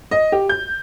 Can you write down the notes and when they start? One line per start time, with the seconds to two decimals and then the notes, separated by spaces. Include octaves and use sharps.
0.11 D#5
0.32 G4
0.49 G6